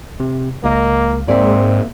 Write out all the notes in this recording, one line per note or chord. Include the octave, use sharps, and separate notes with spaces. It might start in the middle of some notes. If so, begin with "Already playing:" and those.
C3
C#2 A#3 A#4 D#5
G#2 A#3 C4 G#4 D5 E5